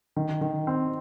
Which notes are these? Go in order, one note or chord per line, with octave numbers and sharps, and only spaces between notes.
D#3
D#3
C4